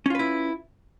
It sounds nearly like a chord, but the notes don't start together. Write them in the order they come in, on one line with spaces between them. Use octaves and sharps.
C#4 F4 B4 E4